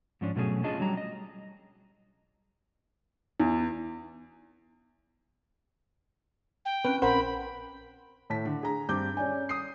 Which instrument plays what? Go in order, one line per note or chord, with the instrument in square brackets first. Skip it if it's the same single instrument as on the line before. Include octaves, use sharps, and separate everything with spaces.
[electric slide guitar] G#2 F3 C#4 D4
B2 F#3 A3 C#4 F4 G#4
C#4 D4 F4 G#4 D#5 A5
F#3 G3 A#5
D#5
[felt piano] E2
[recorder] G5
[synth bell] C4 C#4 D7 [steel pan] B4
[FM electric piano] A#1 A#4 F#5 [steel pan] C5 [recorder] B5
[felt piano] A2 A5 B6
D3
G#4 A#5
G2 C4 D6 G6
C#4 D5 G#5
D#6 C7